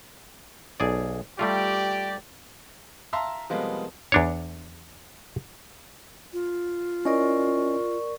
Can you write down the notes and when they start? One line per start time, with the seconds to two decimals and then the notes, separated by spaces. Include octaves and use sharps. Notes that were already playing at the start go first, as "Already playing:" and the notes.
0.80 B1 G#4 D5
1.39 G3 A3 F4 G4 D5
3.13 E5 F5 A5 A#5 C6
3.50 C3 F3 G3 G#3 A#3 B3
4.12 E2 D4 C#5
6.33 F4
7.05 C#4 E4 A#4 D5 D#5 C#6